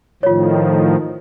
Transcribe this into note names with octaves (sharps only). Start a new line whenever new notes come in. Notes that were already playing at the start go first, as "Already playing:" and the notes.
A2 D#3 F3 F4 C#5